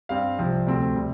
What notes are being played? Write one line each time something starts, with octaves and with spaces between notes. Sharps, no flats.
G2 G3 C4 F5
C2 C3 F3 C4
D2 C3 A3 C4
C3 G3